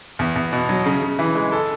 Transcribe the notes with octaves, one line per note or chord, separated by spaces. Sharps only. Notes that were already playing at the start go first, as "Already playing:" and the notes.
E2
E2
B2
F#3
C#3
C#3
E3
G#3
A4